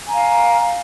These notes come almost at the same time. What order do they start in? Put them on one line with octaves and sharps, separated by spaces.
G#5 A#5 F5